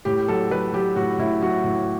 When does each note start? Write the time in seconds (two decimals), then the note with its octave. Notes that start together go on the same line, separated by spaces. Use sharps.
0.05 A2 G4
0.28 F#3 A4
0.51 F#3 B4
0.73 F#3 G4
0.96 A2 F#4
1.18 A2 E4
1.42 F#3 F#4
1.64 A2